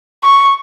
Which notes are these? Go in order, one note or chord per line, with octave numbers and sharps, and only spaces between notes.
C#6